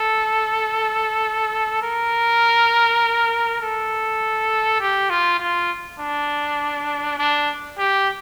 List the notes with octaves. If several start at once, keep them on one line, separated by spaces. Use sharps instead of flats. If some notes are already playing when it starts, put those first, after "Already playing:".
Already playing: A4
A#4
A4
G4
F4
F4
D4
D4
G4